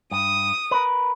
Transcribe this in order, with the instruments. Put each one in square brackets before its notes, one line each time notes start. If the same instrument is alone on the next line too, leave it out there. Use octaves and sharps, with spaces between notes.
[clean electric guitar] G2 [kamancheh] D#6
[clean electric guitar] A#4 B4